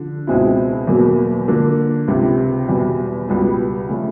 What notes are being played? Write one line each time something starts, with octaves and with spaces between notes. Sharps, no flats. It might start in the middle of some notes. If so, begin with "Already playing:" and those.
Already playing: D3 F3
C#2 B2 G#3 C4 E4
E2 B2 F#3 A#3
D3 F3 A#3
C#2 C3 F3
E2 B2 G3
C#2 B2 G3 B3
C#3 F3 A3 C#4